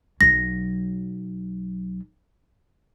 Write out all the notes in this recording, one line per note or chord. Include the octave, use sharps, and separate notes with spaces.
B1 F#3 A#6